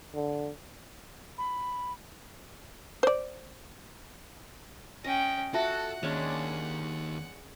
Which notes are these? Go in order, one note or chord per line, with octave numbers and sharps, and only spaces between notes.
D3
B5
C5 D5
C#4 D#5 G5
F4 F#4 A4 E5 F#5 A5
D#2 G#3 C#4 D4